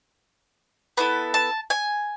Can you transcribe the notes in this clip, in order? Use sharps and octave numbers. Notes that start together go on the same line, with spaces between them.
B3 E4 A4 B5
A5
G#5